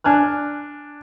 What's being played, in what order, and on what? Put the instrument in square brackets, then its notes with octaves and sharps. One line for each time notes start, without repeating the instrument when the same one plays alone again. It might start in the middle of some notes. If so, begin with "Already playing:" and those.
[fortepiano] D4 G#5 F6 F#6